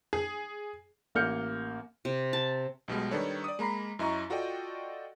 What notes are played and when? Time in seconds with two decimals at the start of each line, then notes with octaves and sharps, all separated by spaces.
0.13 G#4
1.15 A1 A#3 F6 G6 C#7
2.05 C3
2.33 A5
2.88 B1 B2 G3 G#3
3.11 D#3 G3 D4 A4 B4 C#5
3.44 D5 D#6
3.59 G#3 A#3 A#5 B5 C7
3.99 F#2 E4 D#5 A#5 C#6
4.30 F4 F#4 A4 D5 D#5 G5